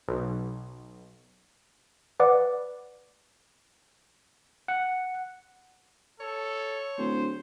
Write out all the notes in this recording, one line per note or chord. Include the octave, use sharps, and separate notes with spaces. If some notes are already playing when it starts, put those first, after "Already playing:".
B1
B4 D5 F#5 D6
F#5
A4 C#5
D1 C5